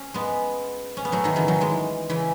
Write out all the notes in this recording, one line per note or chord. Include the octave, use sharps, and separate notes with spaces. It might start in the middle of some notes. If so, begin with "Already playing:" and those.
Already playing: C#4
G#3 B3
C#4
B3
F#3 A3
D#3 F#3
C#3 E3
D#3 F#3
E3 G#3
C#3 E3